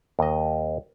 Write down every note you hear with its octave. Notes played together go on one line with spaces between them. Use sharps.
D#2 D#5